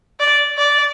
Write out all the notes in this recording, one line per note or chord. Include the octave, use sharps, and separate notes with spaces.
D5
D5